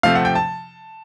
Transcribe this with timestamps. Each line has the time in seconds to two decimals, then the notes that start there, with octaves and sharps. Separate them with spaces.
0.03 C3 F3 A3 C4 F5
0.15 F#5
0.25 G5
0.35 A5